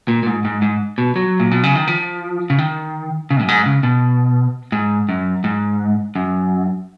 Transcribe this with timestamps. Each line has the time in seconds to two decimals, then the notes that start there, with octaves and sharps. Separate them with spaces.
0.08 A#2
0.23 A#2
0.27 G#2
0.45 G#2
0.62 G#2
0.98 B2
1.16 F#3
1.40 A#2
1.51 B2
1.63 C#3
1.75 D#3
1.87 F3
2.50 C#3
2.58 D#3
3.31 C#3
3.41 F#2
3.48 G#2
3.66 C#3
3.83 B2
4.72 G#2
5.09 F#2
5.44 G#2
6.16 F#2